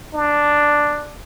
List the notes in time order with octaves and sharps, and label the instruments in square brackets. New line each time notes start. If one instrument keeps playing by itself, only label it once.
[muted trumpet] D4